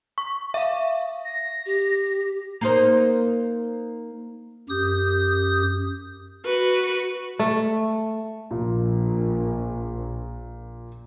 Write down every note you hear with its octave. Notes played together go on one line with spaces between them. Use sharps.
C#6
E5 F5
A#6
G4
A#3 D#4 C5
F#2 G4 D#6 G6
F#4 B4
A3
A#1 A#2